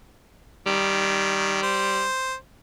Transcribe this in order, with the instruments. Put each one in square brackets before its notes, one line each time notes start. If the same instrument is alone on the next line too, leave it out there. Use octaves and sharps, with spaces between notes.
[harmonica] D#3 [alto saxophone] G3
[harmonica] C5